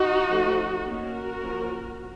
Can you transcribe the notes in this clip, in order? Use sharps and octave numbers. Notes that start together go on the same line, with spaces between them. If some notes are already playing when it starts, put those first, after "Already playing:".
Already playing: D#4 F#4
F3 A3 C#4
D#3 A#3 C#4 F#4 A#4
F3 A#3 C#4